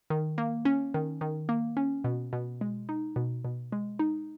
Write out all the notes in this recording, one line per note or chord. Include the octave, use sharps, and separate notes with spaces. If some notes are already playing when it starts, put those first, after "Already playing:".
D#3
A#3
C#4
D#3
D#3
A#3
C#4
B2
B2
G#3
D#4
B2
B2
G#3
D#4